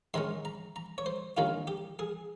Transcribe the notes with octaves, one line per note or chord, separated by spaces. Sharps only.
G#2 D#3 G#3 C#4 C6
A#5
A#5
C#5
C5
G2 D#3 A#3 C#4 F4
G4
G#4